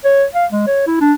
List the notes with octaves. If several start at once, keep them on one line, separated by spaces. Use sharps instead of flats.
C#5
F5
G#3
C#5
E4
D4